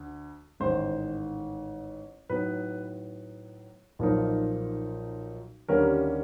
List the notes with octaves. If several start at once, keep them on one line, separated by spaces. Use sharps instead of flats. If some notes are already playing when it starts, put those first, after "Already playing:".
Already playing: D2
A1 G#2 D#3 C5
A2 F#3 B3 D#4 B4
B1 A#2 F3 A#3 D#4
D#2 D3 G3 A#3 C#4 A#4